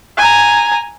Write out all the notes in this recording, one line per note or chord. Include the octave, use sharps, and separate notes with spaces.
G#5 A#5